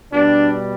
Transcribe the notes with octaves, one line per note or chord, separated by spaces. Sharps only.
B2 G3 D4